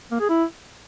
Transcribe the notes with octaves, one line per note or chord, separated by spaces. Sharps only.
A#3
G#4
E4